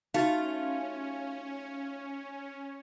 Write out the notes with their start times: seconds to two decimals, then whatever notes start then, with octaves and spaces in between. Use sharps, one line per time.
0.14 A3 C#4 D#4 F4 F#4 A6